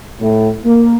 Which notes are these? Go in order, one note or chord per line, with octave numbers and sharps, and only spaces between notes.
A2
A#3